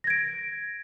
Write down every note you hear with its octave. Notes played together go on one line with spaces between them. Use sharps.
G#6 A#6 D7